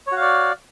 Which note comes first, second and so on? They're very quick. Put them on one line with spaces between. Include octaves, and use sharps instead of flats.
C#5 F#4 F5 D5